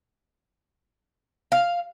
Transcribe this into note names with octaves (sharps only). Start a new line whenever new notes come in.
F5